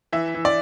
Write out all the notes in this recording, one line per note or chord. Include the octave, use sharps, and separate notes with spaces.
E3 E5
E3
D5